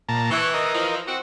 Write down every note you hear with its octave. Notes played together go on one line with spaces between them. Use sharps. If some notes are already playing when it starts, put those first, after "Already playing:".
A#2 A5 A#5
E3 C#6
A#4 D#5
E3 F3
C4 F#4